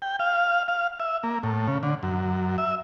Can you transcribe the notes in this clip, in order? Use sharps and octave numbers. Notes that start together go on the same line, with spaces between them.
G5
F5
F5
E5
A#3
A2
C#3
D3
F#2
E5